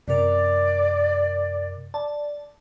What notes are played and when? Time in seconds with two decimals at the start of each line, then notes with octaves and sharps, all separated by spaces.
0.08 F#2 C3 A#4 D5
1.94 D5 A5